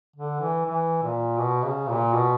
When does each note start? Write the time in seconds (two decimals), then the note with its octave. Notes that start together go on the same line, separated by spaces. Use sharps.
0.16 D3
0.40 E3
0.66 E3
1.03 A#2
1.40 B2
1.64 C#3
1.88 A#2
2.14 B2